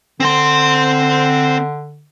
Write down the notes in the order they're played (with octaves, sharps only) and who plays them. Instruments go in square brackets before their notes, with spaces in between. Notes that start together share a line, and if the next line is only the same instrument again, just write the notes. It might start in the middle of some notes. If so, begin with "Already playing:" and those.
[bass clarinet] D3 [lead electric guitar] C4 C6